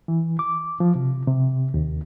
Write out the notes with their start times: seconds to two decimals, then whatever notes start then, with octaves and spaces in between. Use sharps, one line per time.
0.08 E3
0.39 D6
0.80 F3
0.95 C3
1.28 C3
1.74 D#2